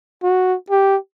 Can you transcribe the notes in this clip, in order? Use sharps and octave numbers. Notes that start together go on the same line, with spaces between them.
F#4
G4